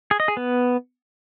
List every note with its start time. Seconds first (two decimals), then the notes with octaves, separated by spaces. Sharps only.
0.11 G#4
0.20 D#5
0.28 G#4
0.37 B3